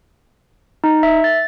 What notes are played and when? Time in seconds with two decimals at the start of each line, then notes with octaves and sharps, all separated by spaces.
0.84 D#4
1.03 E5
1.24 A6